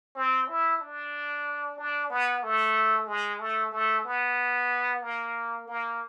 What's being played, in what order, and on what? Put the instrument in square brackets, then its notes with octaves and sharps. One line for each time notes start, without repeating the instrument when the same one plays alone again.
[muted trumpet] C4
E4
D4
D4
B3
A3
G#3
A3
A3
B3
A#3
A#3